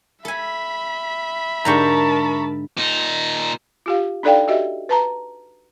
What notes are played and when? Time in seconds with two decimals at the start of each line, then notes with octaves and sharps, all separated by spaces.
0.25 A4 E5 G#5 B5
1.65 G#2 D3 G4 A#4 A5 A#5 C#6
2.77 A#2 D#4
3.86 F4 G4 F5
4.23 D4 D#4 A4 D5 F5 G5
4.48 F#4 G4 D#5 E5
4.89 B4 A5 A#5